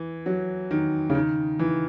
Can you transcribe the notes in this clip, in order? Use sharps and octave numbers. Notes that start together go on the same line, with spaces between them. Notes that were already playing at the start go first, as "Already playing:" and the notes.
Already playing: E3
F#3
D#3
C#3
D#3
E3